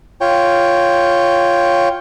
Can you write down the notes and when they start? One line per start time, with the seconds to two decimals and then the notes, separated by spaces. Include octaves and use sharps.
0.21 F4 C#5 G5